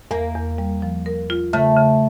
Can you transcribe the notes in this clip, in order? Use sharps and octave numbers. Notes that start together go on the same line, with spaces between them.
E2 A#3
E2
G3
F3
A#4
F4
C#3 A3
C#3